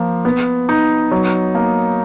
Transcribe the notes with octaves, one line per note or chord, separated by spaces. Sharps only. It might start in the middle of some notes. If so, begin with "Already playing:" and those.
Already playing: F3 A#3
B3
D#4
F#3
A#3